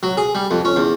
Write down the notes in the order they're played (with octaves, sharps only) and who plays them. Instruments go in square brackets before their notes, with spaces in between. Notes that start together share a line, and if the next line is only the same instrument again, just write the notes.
[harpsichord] F#3
G#4
G3
F2
C#4
E2